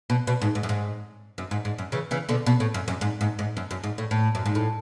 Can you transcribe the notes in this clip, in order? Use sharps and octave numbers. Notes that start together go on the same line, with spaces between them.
B2
B2
G#2
G#2
F#2
G#2
F#2
G#2
G#2
F#2
C#3 E3
C#3 E3
B2 D3
B2
A2
F#2
F#2
G#2
G#2
G#2
F#2
F#2
G#2
A2
A2
F#2
G#2
A2